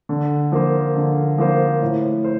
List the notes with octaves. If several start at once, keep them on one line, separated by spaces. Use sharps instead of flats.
D3
F3 A#3 F4 C5
D3
F3 A#3 F4 C5
A2
C5